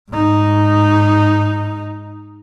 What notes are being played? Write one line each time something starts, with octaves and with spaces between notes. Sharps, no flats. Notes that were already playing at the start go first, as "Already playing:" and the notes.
G#2 D#4